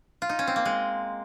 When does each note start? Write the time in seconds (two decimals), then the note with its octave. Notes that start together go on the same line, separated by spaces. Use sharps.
0.22 F4
0.29 D#4
0.39 C#4
0.47 C4
0.56 A#3
0.65 G#3